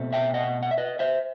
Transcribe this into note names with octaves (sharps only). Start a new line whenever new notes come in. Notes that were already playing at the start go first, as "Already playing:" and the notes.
Already playing: B2 A3 C4
E5 G5
D#5 F#5
F#5
E5
B4 D#5
C5 E5